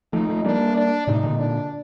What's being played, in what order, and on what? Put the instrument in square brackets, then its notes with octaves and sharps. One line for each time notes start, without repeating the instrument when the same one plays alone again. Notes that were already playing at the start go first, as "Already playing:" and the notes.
[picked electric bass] F3 A3 [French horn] D#4
[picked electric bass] F3 A3
[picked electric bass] G3 A#3 [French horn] D4
[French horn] D4
[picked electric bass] A2 C3 [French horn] D#4
[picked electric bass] A#2 D3
[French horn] D4